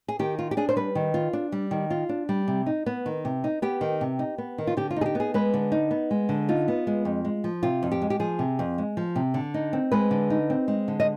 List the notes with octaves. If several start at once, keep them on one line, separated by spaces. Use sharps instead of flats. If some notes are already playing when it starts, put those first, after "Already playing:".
G#4
D#3 G4
F4
G4
D4 G#4
C5
G3 B4
D#3
F4
D4
G3
D#3
F4
D4
G3
C3
D#4
B3
D#3
C3
D#4
B3 G4
D#3
C3
D#4
B3
D#3
F4
D3 G4
F4
D#4 G#4
G4
B3 G#4
G#3 B4
D3
D#4
B3
G#3
D3
D#4 F4
B3
G#3
F2
G#3
F3
C3 F4
F2
G4
G#3
G4
F3 G#4
C3
F2
G#3
F3
C3
D3
D#4
C4
G#3 B4
D3
D#4
C4
G#3
D3
D#5